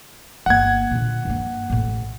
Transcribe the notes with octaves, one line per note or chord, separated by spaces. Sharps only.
G1 A#3 F#5 G#6
A#2 D3
G2 A#3
A1 A2